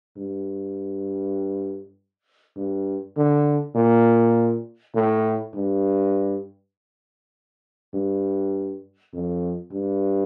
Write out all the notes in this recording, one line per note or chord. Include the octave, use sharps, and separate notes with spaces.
G2
G2
D3
A#2
A2
G2
G2
F2
G2